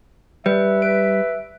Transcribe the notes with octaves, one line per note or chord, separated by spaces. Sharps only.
G3 B4 E5
B4 D7